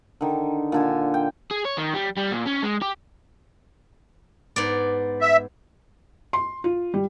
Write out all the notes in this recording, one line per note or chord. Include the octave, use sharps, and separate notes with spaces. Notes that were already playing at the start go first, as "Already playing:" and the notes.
D3 D#3
A#2 D3 G#5
G5
G#4
C#5
D#3
G3
G3
A#2
C#4
G#3
G4
G#2 B3 D5
E5
C6
F4
G3